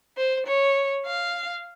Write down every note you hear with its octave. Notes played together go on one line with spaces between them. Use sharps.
C5
C#5
F5